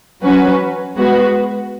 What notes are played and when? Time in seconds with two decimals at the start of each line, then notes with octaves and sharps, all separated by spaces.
0.23 F#3 C#4 F#4 B4
0.96 G#3 B3 F#4 B4